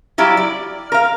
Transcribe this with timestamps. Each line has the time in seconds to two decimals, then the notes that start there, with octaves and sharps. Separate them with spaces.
0.18 F#3 G3 E4 D5 F5
0.37 D5
0.92 A#4 F5